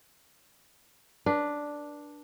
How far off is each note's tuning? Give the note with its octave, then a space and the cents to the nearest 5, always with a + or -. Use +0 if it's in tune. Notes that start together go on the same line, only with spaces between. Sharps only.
D4 +0 B4 -35